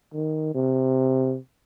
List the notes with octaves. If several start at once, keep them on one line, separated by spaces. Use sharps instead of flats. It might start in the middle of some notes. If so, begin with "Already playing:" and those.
D#3
C3